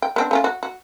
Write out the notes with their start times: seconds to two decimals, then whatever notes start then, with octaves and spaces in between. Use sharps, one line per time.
0.02 G5
0.16 B3 C4 D4
0.31 A3 C#4 F4
0.44 F#4
0.63 F#4